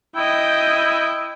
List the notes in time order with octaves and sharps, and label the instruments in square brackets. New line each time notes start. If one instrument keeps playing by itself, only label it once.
[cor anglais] E4 [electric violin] D#5 G5